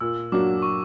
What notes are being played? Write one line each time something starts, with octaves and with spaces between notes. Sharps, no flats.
A#2 E6
F#3 A#3 D4 F#4 D6
C#6